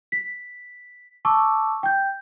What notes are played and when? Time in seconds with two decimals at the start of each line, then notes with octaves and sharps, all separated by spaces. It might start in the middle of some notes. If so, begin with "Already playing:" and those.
0.12 B6
1.25 A5 C#6 D6 E6
1.83 G5 G6